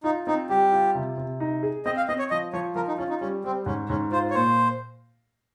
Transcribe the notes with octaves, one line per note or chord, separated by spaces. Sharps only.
D#4 F4
C4 D#4
G3 G4
F4
C3
C3
D#4
G#4
C4 D#5
F5
C4 D#5
C#5
F3 D#5
F3 C#5
F3 A#4
D#4
C#4 F4
D#4
G3 C#4
G3 C4
G#2 C#4
G#2 C#4
F4 C5
C#5
A#2 C5